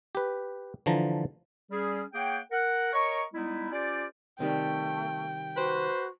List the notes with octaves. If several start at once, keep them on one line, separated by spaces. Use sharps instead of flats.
G4 B4
D3 E3 F3 A5 A#5
G3 C#4 G#4
A#3 G#4 C#5 F#5 G5
A#4 F#5
A#4 C#5 D#5 A#5 C#6
G3 G#3 B3 D#4 E4
C#4 F4 G4 C5 D5
C3 D#3 G3 A3 G5
F#4 B4 C5